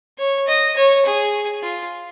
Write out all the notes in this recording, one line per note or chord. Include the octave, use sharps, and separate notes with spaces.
C#5
D#5
C#5
G#4
F4